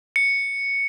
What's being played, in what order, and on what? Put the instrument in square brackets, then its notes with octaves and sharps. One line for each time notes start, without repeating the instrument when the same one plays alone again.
[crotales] C#7